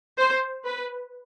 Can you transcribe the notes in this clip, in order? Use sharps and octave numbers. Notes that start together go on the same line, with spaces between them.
C5
B4